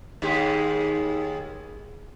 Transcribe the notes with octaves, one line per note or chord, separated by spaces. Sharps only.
D#2 G#3 G4